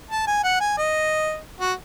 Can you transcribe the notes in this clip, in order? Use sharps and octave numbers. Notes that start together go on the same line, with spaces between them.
A5
G#5
F#5
G#5
D#5
F#4